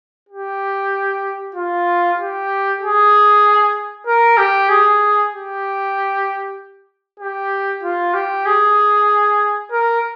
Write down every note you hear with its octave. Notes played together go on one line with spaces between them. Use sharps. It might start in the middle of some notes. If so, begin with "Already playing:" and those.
G4
F4
G4
G#4
A#4
G4
G#4
G4
G4
F4
G4
G#4
A#4